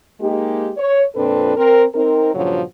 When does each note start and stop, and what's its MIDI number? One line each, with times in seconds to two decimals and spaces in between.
0.21 0.70 56
0.21 0.70 58
0.21 0.70 63
0.21 0.70 67
0.77 1.03 73
1.15 1.53 41
1.15 1.53 46
1.15 1.53 60
1.15 1.53 62
1.15 1.53 69
1.15 1.53 71
1.57 1.85 60
1.57 1.85 70
1.95 2.33 60
1.95 2.33 63
1.95 2.33 70
2.34 2.61 43
2.34 2.61 46
2.34 2.61 49
2.34 2.61 53
2.34 2.61 54